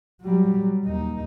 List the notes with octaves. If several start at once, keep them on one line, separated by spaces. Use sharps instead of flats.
F#3 G3
D#2 D#4